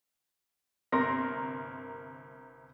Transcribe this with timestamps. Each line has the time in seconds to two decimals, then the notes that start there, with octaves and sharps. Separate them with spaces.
0.92 G1 C3 A#4 C6 A#6